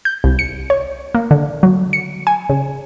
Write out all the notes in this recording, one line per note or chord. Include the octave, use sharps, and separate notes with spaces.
G6
C2
C#7
C#5
A#3
D3
F#3
C#7
G#5
C#3